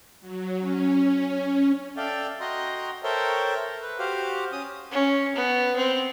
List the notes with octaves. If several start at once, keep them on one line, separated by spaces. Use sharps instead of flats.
F#3
C#4
A4 D5 E5 F5 G5
F#4 D#5 G5 A#5 C6
A4 A#4 C5 C#5 E5 G5
B4
F#4 G4 C5 F5
C#4 D#6
C#4
B3
C4